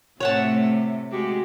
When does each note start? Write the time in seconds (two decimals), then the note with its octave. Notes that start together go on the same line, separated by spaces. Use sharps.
0.20 A2 C3 A3 C#5 F#5 A5
1.11 G#3 F#4 G4